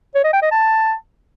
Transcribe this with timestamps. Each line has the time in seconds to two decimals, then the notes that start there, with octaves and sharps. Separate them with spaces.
0.15 C#5
0.24 D#5
0.33 G5
0.42 D#5
0.52 A5